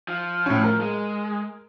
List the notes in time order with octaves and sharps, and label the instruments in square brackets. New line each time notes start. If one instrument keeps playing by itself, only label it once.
[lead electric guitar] F3
[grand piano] A2 C#4
A#4
[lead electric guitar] G#3